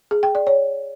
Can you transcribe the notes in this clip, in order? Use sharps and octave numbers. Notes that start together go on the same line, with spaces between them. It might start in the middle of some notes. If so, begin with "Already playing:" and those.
G#4
G5
D5
C#5